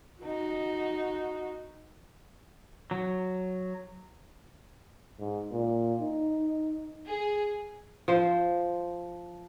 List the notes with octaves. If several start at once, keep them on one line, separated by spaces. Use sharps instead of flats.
D#4 F#4
F#3
G#2
A#2
D#4
G#4
F3 C5